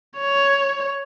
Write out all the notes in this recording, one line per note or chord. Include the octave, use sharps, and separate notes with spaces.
C#5